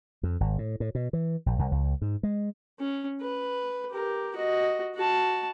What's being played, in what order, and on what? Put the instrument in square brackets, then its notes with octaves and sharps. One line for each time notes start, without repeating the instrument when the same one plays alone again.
[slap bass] F2
G#1
A2
A2
B2
E3
A#1
C2
C#2
G#2
G#3
[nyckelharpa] C#4
B4
G4 A#4
F#4 D#5
F#4 A5